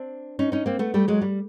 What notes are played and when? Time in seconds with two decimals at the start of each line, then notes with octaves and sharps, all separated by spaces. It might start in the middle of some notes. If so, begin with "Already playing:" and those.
Already playing: C4 D4
0.39 C#4 D#4
0.52 C#4 D#4
0.66 A#3 C4
0.79 A3 B3
0.94 G3 A3
1.08 F#3 G#3
1.22 G3